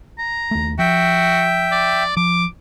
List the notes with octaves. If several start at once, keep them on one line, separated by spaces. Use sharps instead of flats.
A#5
D#2 A3
F3 F#4 E5 G5
D5
F3 D6